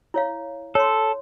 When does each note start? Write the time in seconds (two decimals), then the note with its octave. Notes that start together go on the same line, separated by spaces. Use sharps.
0.14 E4 C#5 F5
0.75 A4 C#5 C6